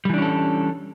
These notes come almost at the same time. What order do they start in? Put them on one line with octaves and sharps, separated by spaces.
G3 E3 D4 C#4 A4